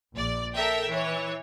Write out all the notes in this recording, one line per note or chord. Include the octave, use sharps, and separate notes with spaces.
A#1 D5
A4 A#4 E5 G5
E3 C#5